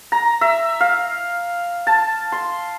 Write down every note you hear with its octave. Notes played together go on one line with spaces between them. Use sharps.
A#5
E5
F5
A5
C6